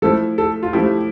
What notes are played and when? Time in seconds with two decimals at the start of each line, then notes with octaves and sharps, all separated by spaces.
0.02 F3 A3 E4 A4
0.38 A4
0.63 F4
0.73 F3 A3 E4 G4